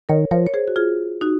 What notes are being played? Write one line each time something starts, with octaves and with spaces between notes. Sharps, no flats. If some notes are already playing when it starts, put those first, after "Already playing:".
D#3 A#4 C#5
F3 A#4 C#5
C#5
G#4 C5
F#4
F4 G#4
D#4 F#4